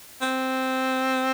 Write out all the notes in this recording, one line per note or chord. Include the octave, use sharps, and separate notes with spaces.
C4